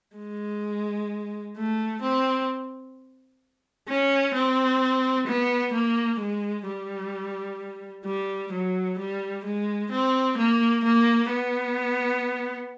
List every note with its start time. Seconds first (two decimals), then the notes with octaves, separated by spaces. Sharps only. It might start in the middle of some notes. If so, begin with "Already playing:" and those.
0.17 G#3
1.56 A3
2.02 C4
3.88 C#4
4.34 C4
5.27 B3
5.73 A#3
6.20 G#3
6.66 G3
8.05 G3
8.52 F#3
8.98 G3
9.45 G#3
9.91 C4
10.38 A#3
10.84 A#3
11.30 B3